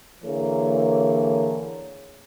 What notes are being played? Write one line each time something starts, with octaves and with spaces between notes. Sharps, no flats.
D3 E3 A#3 G#4 C#5